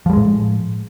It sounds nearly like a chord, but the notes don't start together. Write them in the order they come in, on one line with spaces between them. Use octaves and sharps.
F3 G3 G#3 A2